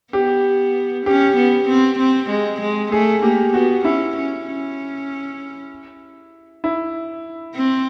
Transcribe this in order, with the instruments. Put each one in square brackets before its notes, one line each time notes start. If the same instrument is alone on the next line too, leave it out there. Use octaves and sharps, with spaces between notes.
[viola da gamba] B3 [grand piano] G4
[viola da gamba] C#4 [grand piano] G4
[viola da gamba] B3
C4
C4
G#3
G#3
[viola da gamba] A3 [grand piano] G#4
[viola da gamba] A#3 [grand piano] G4
[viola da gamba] B3 [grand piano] F#4
[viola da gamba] C#4 [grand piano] E4
[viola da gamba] C#4
C#4
[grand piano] E4
[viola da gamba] C4